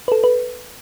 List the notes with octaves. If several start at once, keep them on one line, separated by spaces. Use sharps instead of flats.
B4
A4
B4